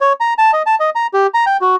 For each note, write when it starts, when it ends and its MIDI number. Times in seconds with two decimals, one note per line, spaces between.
0.01 0.13 73
0.20 0.34 82
0.38 0.51 81
0.53 0.62 75
0.66 0.75 81
0.80 0.90 75
0.95 1.07 82
1.14 1.27 67
1.34 1.45 82
1.46 1.57 79
1.61 1.76 66